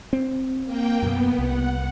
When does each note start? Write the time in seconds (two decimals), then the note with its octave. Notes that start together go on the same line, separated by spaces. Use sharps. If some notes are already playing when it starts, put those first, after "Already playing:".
0.13 C4
0.64 A#3 G5
1.02 F#2 B2 B3
1.38 C2 F#5